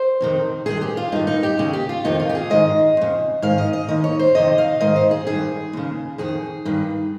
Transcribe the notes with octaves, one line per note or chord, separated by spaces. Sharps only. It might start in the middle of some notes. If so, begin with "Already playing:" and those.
Already playing: C5
F2 C3 D#3
G2 D#3 G#4
G4
F4
G2 D#3 D#4
D#4
G4
D#2 C#3 G#4
G4
F4
F2 C3 D#3 D#4
F4
G4
G#4
G#2 D#3 D#5
F2 C#3
G#2 D#3 F5
D#5
D#5
D#2 D#3 D#5
C#5
C5
F2 C3 D#3 D#5
F5
G#2 D#3 D#5
C5
G#4
G2 D#3 G#4
D#2 C#3
F2 D#3 G#4
G2 D#3